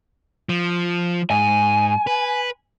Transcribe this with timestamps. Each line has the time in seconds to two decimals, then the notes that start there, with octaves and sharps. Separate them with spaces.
0.49 F3
1.31 G#2 G#5
2.07 B4